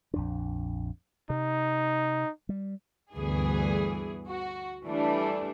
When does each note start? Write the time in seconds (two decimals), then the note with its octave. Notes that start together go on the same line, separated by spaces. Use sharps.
0.14 A#1 F2 D4
1.30 C3 D#4
2.49 G3
3.16 D2 G2 E3 B3 G#4
4.30 F#4
4.86 E3 G3 A3 D4